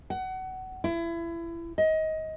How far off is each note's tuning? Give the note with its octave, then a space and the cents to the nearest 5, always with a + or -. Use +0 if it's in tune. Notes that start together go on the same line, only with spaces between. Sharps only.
F#5 +25
E4 +30
D#5 +20